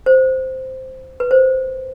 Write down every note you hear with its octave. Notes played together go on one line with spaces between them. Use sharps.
C5
B4
C5